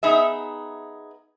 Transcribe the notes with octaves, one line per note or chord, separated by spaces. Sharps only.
B3 D#4 G#4 E5